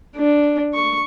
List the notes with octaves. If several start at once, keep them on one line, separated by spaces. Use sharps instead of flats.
D4
C#6